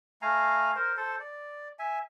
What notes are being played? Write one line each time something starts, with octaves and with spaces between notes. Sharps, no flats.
A3 F5 G#5 A#5
A#4 C5
A4 C5
D5
E5 G#5